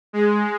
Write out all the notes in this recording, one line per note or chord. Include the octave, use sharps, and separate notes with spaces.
G#3